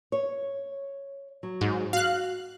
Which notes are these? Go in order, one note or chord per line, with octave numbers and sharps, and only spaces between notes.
C#5
F#3
G#2
F#4 F5 F#6